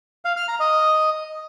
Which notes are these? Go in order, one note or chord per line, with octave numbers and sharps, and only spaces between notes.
F5
F6
A#5
D#5